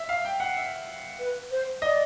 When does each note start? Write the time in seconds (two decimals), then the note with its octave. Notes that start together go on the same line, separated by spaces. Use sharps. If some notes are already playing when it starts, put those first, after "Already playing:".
Already playing: E5
0.09 F5
0.25 G5
0.40 F#5
0.57 E5
1.19 B4
1.51 C5
1.82 D5 D#5